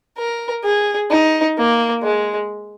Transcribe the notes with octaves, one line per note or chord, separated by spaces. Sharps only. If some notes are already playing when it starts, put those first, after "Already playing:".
A#4
G#4
D#4
A#3
G#3